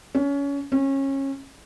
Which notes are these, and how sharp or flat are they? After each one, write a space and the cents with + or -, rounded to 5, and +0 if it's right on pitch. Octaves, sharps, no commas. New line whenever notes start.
C#4 +25
C#4 -25